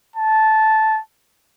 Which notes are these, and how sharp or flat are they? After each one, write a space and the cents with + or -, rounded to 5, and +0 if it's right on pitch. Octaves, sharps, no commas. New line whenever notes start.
A5 -10